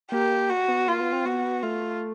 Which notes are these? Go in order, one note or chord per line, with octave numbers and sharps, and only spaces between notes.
A#3 G4
F#4
B3
A#3 F4
B3
C4
B3 F#4
A3 F4